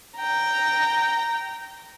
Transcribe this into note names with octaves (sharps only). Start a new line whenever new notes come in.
G5 A#5